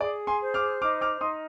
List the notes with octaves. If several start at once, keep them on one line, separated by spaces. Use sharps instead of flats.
G#4 D5
G#5 C6
C5
D6 F6
D#4 D6 F6
D6 F6
D#4 C6 D#6